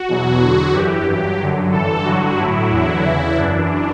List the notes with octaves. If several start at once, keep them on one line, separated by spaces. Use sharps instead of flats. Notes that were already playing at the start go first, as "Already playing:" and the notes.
Already playing: F#4
E2 B2 F#3
E2 D3 F#3
F#2 E3 G4
G2 F#3 G4
F#2 D3 F#3
G2 E3 A4
G2 D3 F#3 F#4
A2 F#3 E4
E2 D3 F#3
E2 C#3 E3
F#2 E3 D4